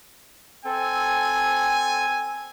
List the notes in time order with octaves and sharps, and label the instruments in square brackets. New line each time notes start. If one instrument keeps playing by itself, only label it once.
[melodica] C4 A4 [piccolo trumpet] G#5